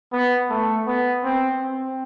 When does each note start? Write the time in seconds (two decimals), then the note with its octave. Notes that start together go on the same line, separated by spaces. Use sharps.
0.12 B3
0.50 A3
0.87 B3
1.24 C4
1.61 C4